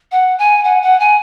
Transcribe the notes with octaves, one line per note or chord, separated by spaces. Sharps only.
F#5
G#5
F#5
F#5
G#5